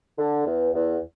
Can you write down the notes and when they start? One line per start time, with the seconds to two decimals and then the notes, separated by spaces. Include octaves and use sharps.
0.18 D3
0.45 E2
0.73 E2